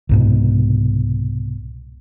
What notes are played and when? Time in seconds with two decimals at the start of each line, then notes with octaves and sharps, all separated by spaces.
0.09 C2 G#2 B2